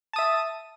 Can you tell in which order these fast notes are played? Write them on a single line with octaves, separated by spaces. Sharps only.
A5 D#6 E5